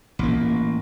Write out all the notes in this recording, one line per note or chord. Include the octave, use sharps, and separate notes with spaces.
A1 A#3